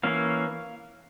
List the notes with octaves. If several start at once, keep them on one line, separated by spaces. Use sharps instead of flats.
E3 A#3 C#4 F5